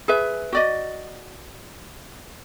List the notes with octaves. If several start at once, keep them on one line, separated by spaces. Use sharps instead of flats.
G#4 B4 E5
F#4 D5 D#5